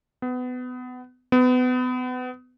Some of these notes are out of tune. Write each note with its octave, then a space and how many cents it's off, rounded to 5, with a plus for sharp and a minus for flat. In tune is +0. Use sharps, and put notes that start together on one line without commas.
B3 +25
B3 +30